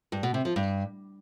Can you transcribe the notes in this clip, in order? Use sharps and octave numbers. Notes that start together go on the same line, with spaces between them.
G2
B2
C3
F3
G2